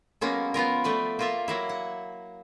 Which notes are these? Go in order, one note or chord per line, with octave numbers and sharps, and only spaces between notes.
F#3 G#3 A#3 B3 C#4
F3 B3 F4 A#4
F3 A3 B4 D5
A#3 F4 E5
F#3 A#3 E4
F#5